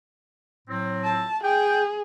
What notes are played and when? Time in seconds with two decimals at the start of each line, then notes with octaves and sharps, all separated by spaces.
0.68 A2 F#3 C4
1.04 A5
1.43 G#4 G5